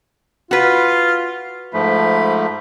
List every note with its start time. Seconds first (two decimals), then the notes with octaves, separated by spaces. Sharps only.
0.51 F4 F#4 B4
1.74 G#2 F3 A3 B5